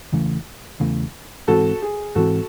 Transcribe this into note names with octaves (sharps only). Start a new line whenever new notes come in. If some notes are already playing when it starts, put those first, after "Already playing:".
E2 C#3 E3 A3
E2 C#3 E3 A3
G#2 E3 C4 F#4 A4
G#4
G#2 E3 C4 F#4 A4